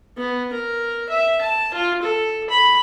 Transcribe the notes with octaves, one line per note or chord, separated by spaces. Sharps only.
B3
A#4
E5
A5
F4
A4
B5